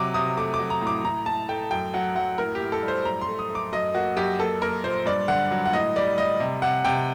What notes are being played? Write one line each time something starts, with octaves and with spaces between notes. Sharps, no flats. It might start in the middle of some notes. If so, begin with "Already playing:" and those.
Already playing: C3 F#3 D6
C3 D#6
A3 D6
D6
F#3
A#5
A2
D6
A2 A#5
A2 A5
A3 G5
F#2 G5
F#3 F#5
F#2 F#5
A2 A#4
A2 G4
A4
G3
C5
F#2 A#5
C6
A3
D#6
A3
D6
F#2 D#5
A#3 F#4
F#2 G4
A#3 A4
A#3 A#4
A#2 C5
G2 D5
D3 F#5
F#3
F#5
A2 D#5
G3 D5
G3 D#5
C3
C3 F#5
C3 G5